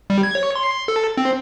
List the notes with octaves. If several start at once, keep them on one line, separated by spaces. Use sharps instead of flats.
G3
G#6
C#5
C6
A4
C4